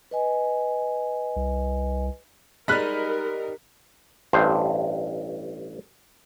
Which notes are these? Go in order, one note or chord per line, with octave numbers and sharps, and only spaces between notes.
B4 D#5 G#5
C2
G3 G#3 D#4 A#4 B5 F6 F#6 B6
A1 G2 C5